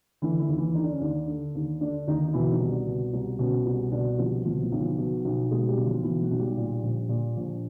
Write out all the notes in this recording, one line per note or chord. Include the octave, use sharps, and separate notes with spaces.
D3 E3 E4
E3 E4
D#2
E3 E4
D3 D#4
D4
C#4
D#2 D4
D3
D#2
D3 D4
D#2 D#3 D#4
D#4
B2 E3 E4
D#3 D#4
C2
D4
B2
C2
B2 C#4
C2
B2 D4
C2 F3 F4
B2 F3 F4
F3 F4
B1
F3 F4
B2
B1
B2 G#3 G#4
G3 G4
B1
F3 F4
B2 E3 E4
F#3 F#4
B1
G3 G4
A#2
A#1
A#2
A#1